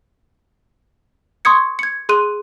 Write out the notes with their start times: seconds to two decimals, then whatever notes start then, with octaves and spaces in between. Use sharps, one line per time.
1.45 C6 C#6 D#6 G#6 C#7
1.79 G#6 C#7
2.09 G#4 C6 F#6 D#7